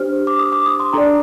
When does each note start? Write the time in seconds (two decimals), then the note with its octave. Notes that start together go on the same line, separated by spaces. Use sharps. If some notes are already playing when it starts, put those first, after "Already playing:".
Already playing: D4 G4 C5 F6
0.27 D6
0.39 D#6
0.52 D6
0.66 D#6
0.80 C6
0.93 D4 A4 D5 A#5